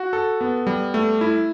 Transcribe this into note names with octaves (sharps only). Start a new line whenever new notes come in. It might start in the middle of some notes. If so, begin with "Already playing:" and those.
Already playing: F#4
A4
B3
G3
A3
E4